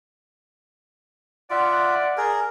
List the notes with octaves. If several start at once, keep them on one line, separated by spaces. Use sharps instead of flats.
F4 D5 E5 F#5
G#4 A#4